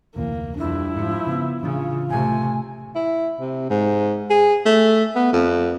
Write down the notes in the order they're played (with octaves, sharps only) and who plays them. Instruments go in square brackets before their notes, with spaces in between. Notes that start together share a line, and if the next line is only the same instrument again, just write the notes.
[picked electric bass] F1 D2 E3 [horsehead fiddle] A#3
[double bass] F2 [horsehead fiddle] G3 D4 [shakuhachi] E4
[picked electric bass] G#2 [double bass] F3
[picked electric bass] C#3 [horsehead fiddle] B3
[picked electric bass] A1 E3 D4 [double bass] C#3 [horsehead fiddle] F4
[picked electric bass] A1 [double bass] C3 A3 [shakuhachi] G#5
[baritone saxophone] E4
C3
G#2
G#4
A3
B3
F2